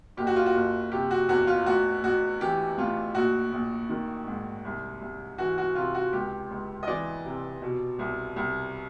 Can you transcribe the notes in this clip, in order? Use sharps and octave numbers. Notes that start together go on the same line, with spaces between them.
F#1 G4
F#4
F4
F#4
F#1
C3 G4
F#4
E2 F#4
F4
A1 F#4
A1 F#4
E3 G4
A2 F4
A#1 F#4
A#1
D#3
G#2
C2
C2
E3 F#4
F#4
C3 F4
F#4
C#2 G4
C#2
D#5
E3 D5
C3
B2
C2
C2